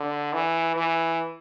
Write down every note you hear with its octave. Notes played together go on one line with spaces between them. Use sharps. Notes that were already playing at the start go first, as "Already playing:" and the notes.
Already playing: D3
E3
E3